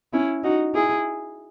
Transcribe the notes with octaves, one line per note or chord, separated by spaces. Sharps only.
C#4 E4
D#4 F#4
E4 G#4